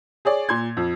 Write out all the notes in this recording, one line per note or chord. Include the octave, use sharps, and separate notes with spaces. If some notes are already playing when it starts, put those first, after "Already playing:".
G#4 C#5 D5
A#2 C6 G#6
F2